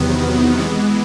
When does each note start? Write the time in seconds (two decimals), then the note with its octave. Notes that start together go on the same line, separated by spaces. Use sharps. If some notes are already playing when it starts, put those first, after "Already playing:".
Already playing: E2 C3 D#3 F#3 B3
0.60 E3 G#3 B3